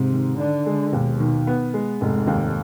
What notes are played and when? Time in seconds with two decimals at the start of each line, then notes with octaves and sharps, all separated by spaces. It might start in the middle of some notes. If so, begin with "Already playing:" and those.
Already playing: G#2 C3
0.12 D#3
0.39 D3 D4
0.66 G#3
0.93 D#2 B2
1.20 D#3
1.47 B3
1.74 G#3
2.01 F1 G#2
2.27 D#2